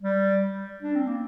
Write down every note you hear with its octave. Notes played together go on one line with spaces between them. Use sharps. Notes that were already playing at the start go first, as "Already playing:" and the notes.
G3
D4
C4
A#3